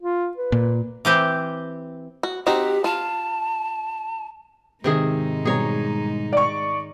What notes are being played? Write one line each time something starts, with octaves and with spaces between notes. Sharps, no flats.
F4
B4
A#2
E3 C4 G4
F#4
C4 D#4 F#4 G4
F4 A5
G#2 C3 D#3 G#3 D#4 G#4
B2 G3 G#4 C#5 A#5
D5 C#6